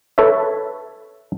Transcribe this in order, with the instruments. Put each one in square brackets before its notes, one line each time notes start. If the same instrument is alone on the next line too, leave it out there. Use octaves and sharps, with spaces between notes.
[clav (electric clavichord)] A4 B4 C#5 E5